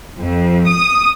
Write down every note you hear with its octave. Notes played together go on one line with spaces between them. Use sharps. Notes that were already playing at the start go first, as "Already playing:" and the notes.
F2
D#6